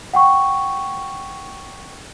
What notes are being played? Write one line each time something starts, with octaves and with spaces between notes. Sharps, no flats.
F#5 G5 C#6